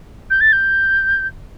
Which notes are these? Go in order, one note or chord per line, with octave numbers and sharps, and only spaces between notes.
G6
A6
G6